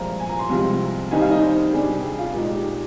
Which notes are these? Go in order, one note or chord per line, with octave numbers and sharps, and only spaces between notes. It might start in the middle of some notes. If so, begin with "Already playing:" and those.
Already playing: C2 A#2 F3 G#3 C4 A#5
G#5
A#5
C6
C2 C3 F3 G#3
D#2 D#3 G3 C4 D#4 G#5
F5
D#5
C5
C3 G3 D4 G#4
G4
G#4
F4
A#2 G#3 D#4
G4